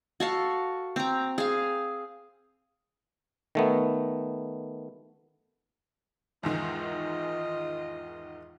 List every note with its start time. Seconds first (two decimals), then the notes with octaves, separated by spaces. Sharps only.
0.20 F#4 A4 F5
0.96 C4 A#5
1.38 G#4 F5
3.55 D#3 A3 B3
6.43 E2 G#2 D#3 F4 D#5